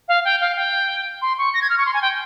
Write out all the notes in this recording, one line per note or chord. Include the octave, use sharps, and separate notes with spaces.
F5
G5
F5
G5
C6
C#6
A#6
G#6
F6
C#6
C6
G#5
G5